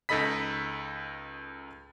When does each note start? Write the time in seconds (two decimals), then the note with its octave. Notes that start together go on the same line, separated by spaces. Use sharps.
0.09 C#2 D#4 A4 D#5 B5 B6